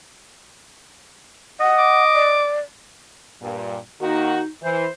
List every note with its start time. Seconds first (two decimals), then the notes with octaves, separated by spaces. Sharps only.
1.60 D#5 F#5
1.79 D6
2.14 D5
3.42 G2 A#2
4.01 D#3 A#3 D#4 F#4
4.63 E3 C5